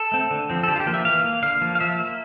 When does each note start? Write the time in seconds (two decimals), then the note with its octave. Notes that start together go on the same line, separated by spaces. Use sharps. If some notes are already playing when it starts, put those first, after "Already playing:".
Already playing: A4
0.12 A3 C4
0.31 D3
0.50 F3 C4
0.63 A4
0.68 D3 G4
0.76 F4
0.80 G4
0.86 F3 A#3
0.94 E5
1.05 E3 F5
1.24 A#3
1.43 D3 F5
1.61 F3 A#3
1.75 F5
1.80 F3 E5
1.99 A#3